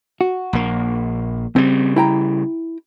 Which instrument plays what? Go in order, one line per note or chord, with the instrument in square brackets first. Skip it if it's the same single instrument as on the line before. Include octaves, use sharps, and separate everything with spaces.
[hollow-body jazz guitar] F#4
[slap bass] A#1 A#3
[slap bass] C#3 G3 [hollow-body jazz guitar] C4
[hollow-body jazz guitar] E4 G5 A#5